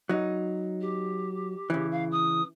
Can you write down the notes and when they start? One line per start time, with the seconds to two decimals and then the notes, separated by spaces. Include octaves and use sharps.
0.09 F#3 D#4
0.81 G4
1.70 C#3 E3
1.92 F5
2.12 D#6